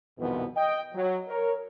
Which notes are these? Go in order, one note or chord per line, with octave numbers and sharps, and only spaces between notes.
C2 F2 B2 D#3 E3 B3
D#5 G5
F#3
A#4 C#5